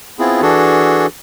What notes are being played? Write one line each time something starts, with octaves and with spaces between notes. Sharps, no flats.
B3 C4 E4 F4 G#4
E3 D4 F#4 G#4 A4